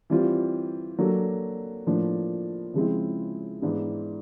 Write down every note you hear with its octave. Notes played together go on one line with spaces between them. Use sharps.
E3 G3 C4 F4
F#3 A#3 D4 F#4 A4
A2 F3 A#3 D4
C#3 F3 G#3 C4 E4
G#2 E3 G#3 B3 D4